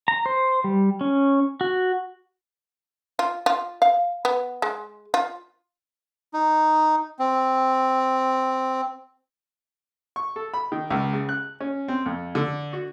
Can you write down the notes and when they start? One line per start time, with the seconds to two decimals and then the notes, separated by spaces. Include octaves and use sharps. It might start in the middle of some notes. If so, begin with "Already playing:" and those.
0.08 A#5
0.26 C5
0.64 G3
1.01 C#4
1.61 F#4
3.19 F4
3.46 F4
3.82 F5
4.25 B3
4.62 G#3
5.14 F4
6.34 D#4
7.19 C4
10.16 C#6
10.36 A4
10.54 B5
10.72 D#3
10.90 C#2
11.13 C#3
11.29 F#6
11.61 C#4
11.88 C4
12.06 F2
12.35 D3
12.73 F#4